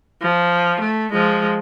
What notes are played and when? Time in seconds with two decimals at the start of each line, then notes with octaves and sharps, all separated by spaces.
0.22 F3
0.81 A3
1.12 F3 G#3